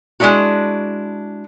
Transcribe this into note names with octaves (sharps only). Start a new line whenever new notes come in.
G#3 C#4 D4 E4 F#4